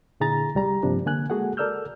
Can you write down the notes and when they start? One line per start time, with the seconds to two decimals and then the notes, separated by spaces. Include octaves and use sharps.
0.20 A#2 D3 E4 G#4 A#5 A6
0.55 C2 G3 A#5
0.83 G2 C3 F3 A#3 D4
1.06 D3 A#3 G#5 F#6
1.30 G#3 A#3 F#4 G#4 A4 F#5
1.57 A4 A#4 D5 E6 F6 G6